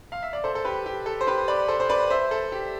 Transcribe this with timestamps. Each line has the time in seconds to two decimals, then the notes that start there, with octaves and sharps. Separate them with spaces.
0.12 F5
0.23 E5
0.33 D5
0.44 A4 C5
0.55 A4
0.65 G4 B4
0.86 G4
1.06 A4
1.21 C5
1.27 G4 B4
1.48 B4 D5
1.68 A4 C5
1.80 C5
1.89 B4 D5
2.10 C5 E5
2.31 A4
2.52 G4